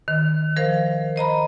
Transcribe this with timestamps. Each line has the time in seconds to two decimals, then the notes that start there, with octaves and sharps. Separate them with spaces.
0.08 D#3
0.56 F3 A#4 C5 F5
1.16 C5 D#5 A#5 B5